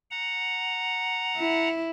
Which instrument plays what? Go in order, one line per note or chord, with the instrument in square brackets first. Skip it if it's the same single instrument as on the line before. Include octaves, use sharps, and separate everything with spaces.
[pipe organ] F#5 A#5
[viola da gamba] E4